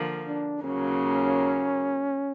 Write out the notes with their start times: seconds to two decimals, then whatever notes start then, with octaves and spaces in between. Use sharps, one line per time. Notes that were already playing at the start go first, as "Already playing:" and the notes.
Already playing: D3 F3 A#3
0.27 D4
0.63 D#2 C#3 F#3 A#3 C#4